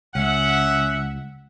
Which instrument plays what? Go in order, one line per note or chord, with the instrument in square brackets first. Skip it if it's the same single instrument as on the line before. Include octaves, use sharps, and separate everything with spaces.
[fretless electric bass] C#2 [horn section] C#4 E5 F#5